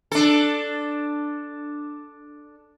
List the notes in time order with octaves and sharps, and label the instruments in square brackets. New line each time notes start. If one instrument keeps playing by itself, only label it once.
[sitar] D4 A4